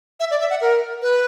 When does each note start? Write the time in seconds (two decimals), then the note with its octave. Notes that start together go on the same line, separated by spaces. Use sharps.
0.20 E5
0.31 D5
0.41 E5
0.50 F#5
0.61 A#4
1.02 B4